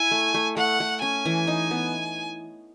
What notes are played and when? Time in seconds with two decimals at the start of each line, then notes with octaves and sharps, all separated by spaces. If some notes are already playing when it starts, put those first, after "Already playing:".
Already playing: E4 G#5
0.11 A3
0.34 A3
0.57 A3 F#5
0.80 A3
1.02 C#4 G#5
1.25 E3
1.47 D#4
1.71 B3